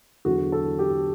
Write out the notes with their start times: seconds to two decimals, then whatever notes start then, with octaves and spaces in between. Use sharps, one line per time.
0.25 E2 D3 F#3 F#4
0.52 A4
0.79 G4